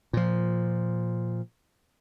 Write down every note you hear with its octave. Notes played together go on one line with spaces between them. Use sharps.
A#2 F3